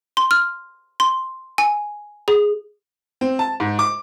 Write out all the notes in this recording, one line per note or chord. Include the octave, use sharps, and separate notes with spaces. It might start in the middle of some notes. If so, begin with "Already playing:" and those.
C6
F6
C6
G#5
G#4
C4
A5
G#2
D6